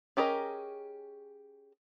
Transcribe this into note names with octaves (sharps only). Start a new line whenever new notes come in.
C#4 G4 G#4 A#4 D#5